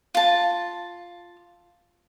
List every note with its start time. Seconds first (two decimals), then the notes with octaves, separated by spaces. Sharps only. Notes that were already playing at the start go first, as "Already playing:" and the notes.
0.15 F4 A5